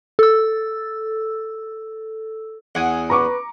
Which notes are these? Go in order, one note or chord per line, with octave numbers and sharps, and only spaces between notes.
A4 E6
E2 F#5 G#5 D#6
B4 A#5 C#6 D6